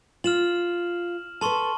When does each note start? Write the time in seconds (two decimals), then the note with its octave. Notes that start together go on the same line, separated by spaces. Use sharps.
0.24 F4 F6 E7 F#7
1.41 A4 B4 A5 C6 C#6